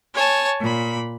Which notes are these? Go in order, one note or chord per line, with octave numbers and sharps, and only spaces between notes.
C#5 G#5 A5
A#2 B5